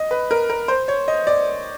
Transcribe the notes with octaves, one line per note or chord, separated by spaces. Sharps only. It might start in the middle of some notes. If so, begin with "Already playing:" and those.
Already playing: D#5
B4
A#4
A#4
C5
C#5
D#5
D5